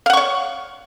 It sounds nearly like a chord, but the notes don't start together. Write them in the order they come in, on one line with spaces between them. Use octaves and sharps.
F5 F#5 C#6 C#5